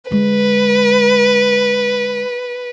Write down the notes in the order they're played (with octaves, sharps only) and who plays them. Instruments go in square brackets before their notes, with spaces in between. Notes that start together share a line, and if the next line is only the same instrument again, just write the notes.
[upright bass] D3 G#3 [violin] B4